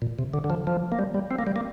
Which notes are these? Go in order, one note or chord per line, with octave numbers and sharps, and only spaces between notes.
A#2
C3
D3
D3
F3
F3
A#3
G3
G3
C4
A#3
G3
A#3